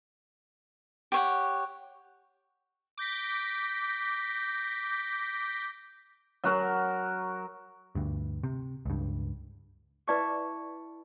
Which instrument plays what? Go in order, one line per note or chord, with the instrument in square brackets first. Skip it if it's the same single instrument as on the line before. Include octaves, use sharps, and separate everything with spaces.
[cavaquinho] G4 C#5 F#5
[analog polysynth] D6 G6 A#6 B6
[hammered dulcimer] F#3 F#4 A#4
[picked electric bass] D2 G2
C3
C#2 G2
[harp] E4 A5 C#6 [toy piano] B4 D5 D6